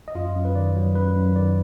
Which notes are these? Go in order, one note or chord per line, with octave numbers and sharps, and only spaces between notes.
D#5
F#2 F4 F5
F#2
B4
D#3 D5
F#3
F#2 B4
F#2
D#3 D5